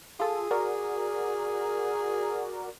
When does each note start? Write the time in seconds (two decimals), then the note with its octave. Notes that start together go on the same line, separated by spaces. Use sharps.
0.20 F4 G#4 A4
0.51 F#4 A#4 D5